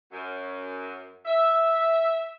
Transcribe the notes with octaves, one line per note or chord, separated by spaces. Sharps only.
F#2
E5